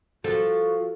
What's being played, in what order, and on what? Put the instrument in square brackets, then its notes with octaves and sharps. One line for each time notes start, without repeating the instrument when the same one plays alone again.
[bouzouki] F3 [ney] F#4 [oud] A4